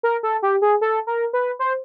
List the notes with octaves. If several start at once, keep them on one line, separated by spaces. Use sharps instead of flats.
A#4
A4
G4
G#4
A4
A#4
B4
C5